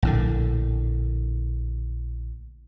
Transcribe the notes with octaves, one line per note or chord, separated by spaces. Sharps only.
A#1 A2 D3